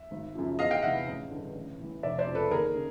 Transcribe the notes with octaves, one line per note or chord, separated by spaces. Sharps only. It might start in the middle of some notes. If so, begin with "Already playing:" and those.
Already playing: E5
G#1
F#2 C#3 F3
E2 D#5 F5
F5 G5
C3 E3 E5 F#5
A1
G2 D3
A1
A2 E3
F1 D5 E5
C5 D5
F2 C#3
A4 B4
D#2 G#4 A#4
C#3